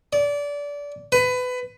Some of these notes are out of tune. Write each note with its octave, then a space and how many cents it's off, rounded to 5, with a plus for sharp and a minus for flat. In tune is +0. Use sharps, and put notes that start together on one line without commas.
D5 -25
B4 +20